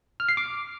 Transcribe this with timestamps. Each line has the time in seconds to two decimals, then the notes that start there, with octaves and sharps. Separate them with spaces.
0.20 F6
0.29 C7
0.37 D6